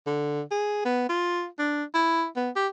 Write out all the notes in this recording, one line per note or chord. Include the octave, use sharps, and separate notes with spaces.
D3
G#4
B3
F4
D4
E4
B3
G4